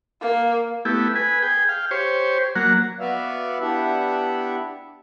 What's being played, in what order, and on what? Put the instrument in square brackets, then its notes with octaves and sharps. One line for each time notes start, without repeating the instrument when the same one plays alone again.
[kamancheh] A#3
[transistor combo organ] A3 B3 E4 G4
B4 G#5
G#4 G5
F5 G5
G4 C5 C#5
F#3 A#3 F#5
[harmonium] B3 F#4 B4 D5 E5 F5
B3 D4 E4 G4 E5 F#5